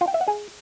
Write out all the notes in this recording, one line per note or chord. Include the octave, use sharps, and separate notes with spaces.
F4
G5
E5
F#5
G#4